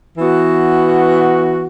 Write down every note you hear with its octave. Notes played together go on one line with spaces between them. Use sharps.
E3 B3 F#4